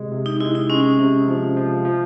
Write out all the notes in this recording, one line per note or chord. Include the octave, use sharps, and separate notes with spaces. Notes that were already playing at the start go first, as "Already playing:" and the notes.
Already playing: C3 G#3
C3
D#4
G#3 E4
D#4
G#3 C#4
C3
F3
F3
F3